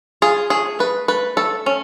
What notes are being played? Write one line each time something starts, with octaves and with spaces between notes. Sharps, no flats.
F4 G#4
A3 G#4
A3 B4
A3 B4
A3 A4
C#4